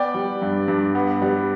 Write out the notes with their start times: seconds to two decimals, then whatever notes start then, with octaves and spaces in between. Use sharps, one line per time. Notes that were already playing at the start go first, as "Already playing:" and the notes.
Already playing: B3 D5 G5
0.14 G3
0.42 G2
0.68 G2
0.95 B3
1.22 G3